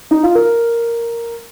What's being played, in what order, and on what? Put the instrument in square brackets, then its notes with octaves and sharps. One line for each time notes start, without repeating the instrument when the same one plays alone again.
[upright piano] D#4
F4
A#4